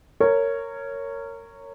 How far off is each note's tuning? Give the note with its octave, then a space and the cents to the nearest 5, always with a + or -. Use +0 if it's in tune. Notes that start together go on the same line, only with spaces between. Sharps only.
A#4 -20 C#5 +0